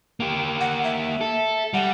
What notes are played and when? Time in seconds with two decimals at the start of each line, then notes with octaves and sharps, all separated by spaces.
0.20 A#3 G4
0.60 F#5
0.84 E5
1.21 A4
1.74 G3 F#5